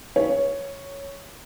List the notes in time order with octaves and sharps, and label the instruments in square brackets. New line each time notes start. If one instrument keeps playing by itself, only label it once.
[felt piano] C#5